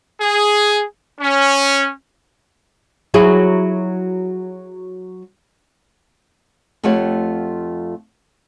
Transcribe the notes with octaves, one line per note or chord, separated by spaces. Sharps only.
G#4
C#4
F#3 E4 G#4
F2 A3 F4 G4 C#5 F#5